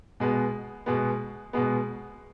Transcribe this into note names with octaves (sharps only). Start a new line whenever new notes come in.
B2 G#3 B3
B2 G#3 B3
B2 G#3 B3